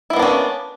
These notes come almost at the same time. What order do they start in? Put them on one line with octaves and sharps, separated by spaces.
E4 B3 A#3 D4 C#4